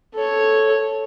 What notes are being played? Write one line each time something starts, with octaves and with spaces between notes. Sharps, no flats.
A4 C#5